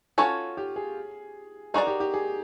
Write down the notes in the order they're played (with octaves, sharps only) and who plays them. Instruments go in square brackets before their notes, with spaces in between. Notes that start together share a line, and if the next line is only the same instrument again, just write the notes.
[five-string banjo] C#4 F#4 A4 C#5 [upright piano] F4
[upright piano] G4
G#4
[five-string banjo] D#4 F#4 A#4 D5 [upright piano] G#4
[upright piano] G4
G4
G#4